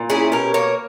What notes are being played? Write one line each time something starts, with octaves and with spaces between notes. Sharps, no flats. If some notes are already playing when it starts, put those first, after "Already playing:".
Already playing: A#2
C#4 E4 G#4
B2 G4 A#4
A#3 A#4 C#5